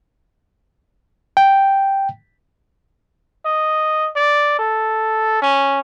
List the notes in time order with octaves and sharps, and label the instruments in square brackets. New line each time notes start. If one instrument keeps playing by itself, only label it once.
[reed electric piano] G5
[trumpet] D#5
D5
A4
C#4